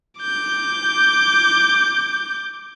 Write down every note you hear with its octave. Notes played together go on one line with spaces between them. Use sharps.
D6 G6